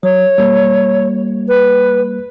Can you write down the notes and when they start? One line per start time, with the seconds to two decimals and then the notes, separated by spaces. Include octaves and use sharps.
0.03 F#3 C#5
0.38 G3 A#3
1.48 B4